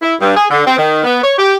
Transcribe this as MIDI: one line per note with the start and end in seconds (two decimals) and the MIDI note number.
0.02 0.15 64
0.20 0.33 43
0.36 0.45 68
0.50 0.63 50
0.66 0.74 60
0.78 1.03 51
1.04 1.22 59
1.23 1.33 73
1.38 1.57 67